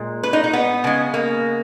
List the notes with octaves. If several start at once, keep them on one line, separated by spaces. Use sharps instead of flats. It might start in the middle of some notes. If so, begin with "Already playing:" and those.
Already playing: A#2 G#3
B4
D#4
D#4
B3
C#3 G#3
A#3